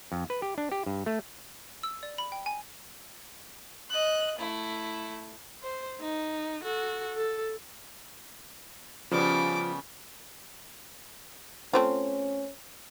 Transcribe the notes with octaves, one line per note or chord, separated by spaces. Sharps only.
F2
B4
G4
D4
G4
G2
A3
E6
D5
B5
G5
G#5
D#5 F#6
A3 E4
C5
D#4
F#4 A4
A4
C#3 F3 G3 B3 D6
A3 C4 C#4 F4 C5